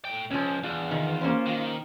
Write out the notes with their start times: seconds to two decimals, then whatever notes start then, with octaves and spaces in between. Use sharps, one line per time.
0.05 A2 G5
0.31 C#2 F3 C#4
0.63 E2 D4 F4
0.91 D#3
1.21 A#3 C#4 C5
1.46 D#3